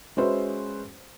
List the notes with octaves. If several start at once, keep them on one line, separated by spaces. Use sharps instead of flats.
G#3 C#4 F#4 B4 C5 E5